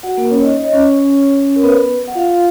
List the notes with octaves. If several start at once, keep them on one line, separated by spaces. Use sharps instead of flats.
F#4 F#5
A#3 A#4
C#4 C#5
D#4 D#5
C#5
D#5
C#4 C#5
A#4
B3 B4
F#5
F4 F5